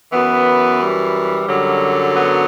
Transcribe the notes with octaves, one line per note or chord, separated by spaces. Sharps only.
F#2 E3 B3
G3
F#2 D3 F#3
B3